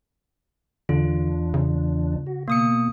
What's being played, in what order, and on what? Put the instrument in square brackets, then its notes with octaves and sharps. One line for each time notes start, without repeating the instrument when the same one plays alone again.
[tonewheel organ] E2 D4 [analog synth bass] D3 [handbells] F4
[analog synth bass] C#3
[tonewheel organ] F#4
[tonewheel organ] B2 [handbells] A#3 D#6 C#7